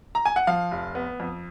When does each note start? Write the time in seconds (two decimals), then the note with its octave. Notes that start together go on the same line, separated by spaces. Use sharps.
0.15 A#5
0.25 G#5
0.36 F#5
0.47 F3 F5
0.71 F1
0.95 B3
1.20 F2